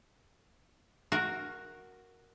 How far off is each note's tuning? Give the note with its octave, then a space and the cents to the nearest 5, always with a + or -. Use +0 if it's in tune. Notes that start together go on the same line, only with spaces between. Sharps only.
F#4 +0 A#4 +0